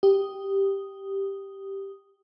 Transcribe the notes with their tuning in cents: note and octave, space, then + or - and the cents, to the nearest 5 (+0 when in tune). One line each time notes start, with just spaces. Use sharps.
G4 +0 D#6 +0